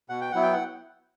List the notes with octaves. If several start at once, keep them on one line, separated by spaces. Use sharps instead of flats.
B2 F#5
G5
F#3 B3 E4 F#5
G5
F#5